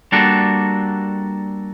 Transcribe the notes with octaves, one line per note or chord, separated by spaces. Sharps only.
G3 A#3 D4 F#4 A4